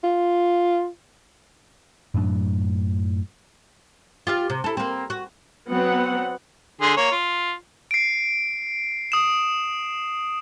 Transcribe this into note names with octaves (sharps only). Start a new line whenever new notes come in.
F4
F#2 A2 F#3 D4
F4 G4 F5
C3
E4 A4
A#3 C4
F#4
F#3 B3 C4 F#5
D3 G#4 C6
A#3 C#5
F4
C7 D7
D#6 E7